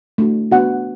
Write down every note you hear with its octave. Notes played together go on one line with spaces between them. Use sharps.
A3 D4 F#4
B3 D4 F#4 F#5